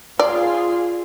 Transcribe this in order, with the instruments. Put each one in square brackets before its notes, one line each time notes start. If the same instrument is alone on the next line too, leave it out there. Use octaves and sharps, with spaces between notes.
[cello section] F4 G#4 [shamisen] D5